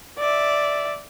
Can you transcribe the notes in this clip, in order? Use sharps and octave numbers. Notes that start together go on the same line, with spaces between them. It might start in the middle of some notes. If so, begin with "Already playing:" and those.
D5 E5